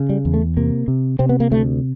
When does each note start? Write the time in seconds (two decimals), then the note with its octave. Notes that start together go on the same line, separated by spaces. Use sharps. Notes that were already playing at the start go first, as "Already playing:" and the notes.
Already playing: C#3
0.09 G3
0.25 E2
0.34 A3
0.57 C3 A#3
0.88 C3
1.19 C3 C4
1.29 B3
1.40 A#3
1.51 D2 A3